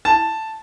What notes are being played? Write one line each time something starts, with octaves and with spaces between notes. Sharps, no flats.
A5